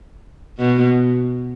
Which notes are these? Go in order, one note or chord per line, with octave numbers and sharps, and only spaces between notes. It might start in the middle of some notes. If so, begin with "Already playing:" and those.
B2